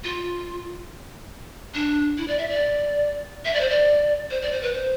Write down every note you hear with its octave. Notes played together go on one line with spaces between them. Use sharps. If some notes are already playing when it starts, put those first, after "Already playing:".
F4
D4
E4
D5
E5
D5
E5
D5
C5
D5
C5
D5
C5
B4
C5